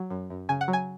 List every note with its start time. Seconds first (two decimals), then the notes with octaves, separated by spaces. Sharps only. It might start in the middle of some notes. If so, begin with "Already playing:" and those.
Already playing: F#3
0.10 F#2
0.30 F#2
0.49 C#3 G#5
0.61 F#5
0.68 F#3
0.73 G#5